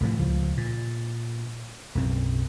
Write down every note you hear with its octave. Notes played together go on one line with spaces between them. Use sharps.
C2 A2 C3 F3
C#2 F3
A#2
B1 F#2 C4